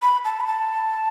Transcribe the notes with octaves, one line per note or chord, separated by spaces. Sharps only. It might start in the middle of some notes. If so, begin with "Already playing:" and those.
B5
A5
B5
A5